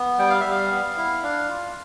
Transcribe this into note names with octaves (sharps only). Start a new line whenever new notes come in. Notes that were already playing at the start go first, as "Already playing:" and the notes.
Already playing: B3
G3 G5
F5
G3 E5
F5
B3
E4
D4 F5
F4